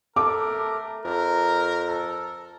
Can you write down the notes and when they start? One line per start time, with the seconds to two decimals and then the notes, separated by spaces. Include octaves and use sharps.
0.16 A3 A#4 A5 D6
1.05 F2 A#4
1.88 A4